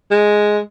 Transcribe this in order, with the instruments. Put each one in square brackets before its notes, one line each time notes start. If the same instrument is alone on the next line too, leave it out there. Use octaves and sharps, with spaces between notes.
[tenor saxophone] G#3